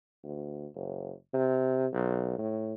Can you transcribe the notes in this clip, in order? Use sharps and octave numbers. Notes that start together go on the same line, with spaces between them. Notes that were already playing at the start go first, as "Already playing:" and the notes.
D2
F#1
C3
B1
A2